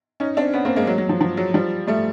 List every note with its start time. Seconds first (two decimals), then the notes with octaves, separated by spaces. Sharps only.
0.20 C#4 D#4
0.37 C4 D4
0.54 B3 C#4
0.65 A#3 C4
0.76 G#3 A#3
0.87 F#3 G#3
0.98 F#3
1.09 F3
1.21 F3
1.37 F#3
1.54 F3 G3
1.87 G3 A3